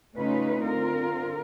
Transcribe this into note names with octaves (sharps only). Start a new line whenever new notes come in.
C#3 A3 C#4 D#4 F4 B4
D3 C4 F4 A#4